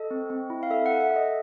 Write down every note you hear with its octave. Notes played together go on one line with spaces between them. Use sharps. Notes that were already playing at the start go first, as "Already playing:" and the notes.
Already playing: A4 D#5
C4
C4
E4
F5
A4 E5
A4 F#5
E5
A4
D#5